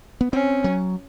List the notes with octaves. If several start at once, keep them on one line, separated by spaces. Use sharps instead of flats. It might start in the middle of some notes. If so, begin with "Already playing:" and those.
B3
C4 C#4
F#3